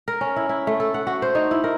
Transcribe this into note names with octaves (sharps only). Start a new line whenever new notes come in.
A#4
C#4
E4
E4
A3
A4
F#5
F#4
C5
D#4
E4
A#4